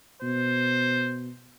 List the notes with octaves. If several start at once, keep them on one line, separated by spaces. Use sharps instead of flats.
B2 C5